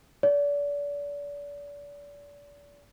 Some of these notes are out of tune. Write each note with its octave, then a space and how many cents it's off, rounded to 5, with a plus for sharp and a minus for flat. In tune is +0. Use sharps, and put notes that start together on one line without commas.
D5 -35